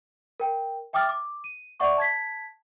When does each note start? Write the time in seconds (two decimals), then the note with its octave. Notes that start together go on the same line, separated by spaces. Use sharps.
0.40 A#4 G5
0.93 E5 G5 D6 D#6 F6 A6
1.09 D6
1.44 D#7
1.80 D5 E5 F#5 C#6 D6
1.98 A5 G#6 B6